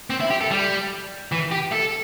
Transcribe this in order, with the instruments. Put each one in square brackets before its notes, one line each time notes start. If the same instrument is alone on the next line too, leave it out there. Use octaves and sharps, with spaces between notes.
[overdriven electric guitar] C4
E4
G4
A4
G3
E3
G4
A4